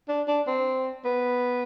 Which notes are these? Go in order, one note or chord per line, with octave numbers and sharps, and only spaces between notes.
D4
D4
C4
B3